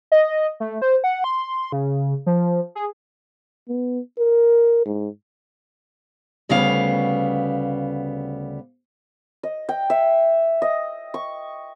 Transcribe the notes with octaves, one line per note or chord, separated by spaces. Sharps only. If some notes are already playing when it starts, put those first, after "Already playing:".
D#5
A3
C5
F#5
C6
C#3
F3
G#4
B3
A#4
G#2
D2 C#3 G3 B3 F5
D#5
G5
E5
D#5
C#6